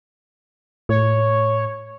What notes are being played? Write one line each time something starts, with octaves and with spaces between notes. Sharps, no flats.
A2 C#5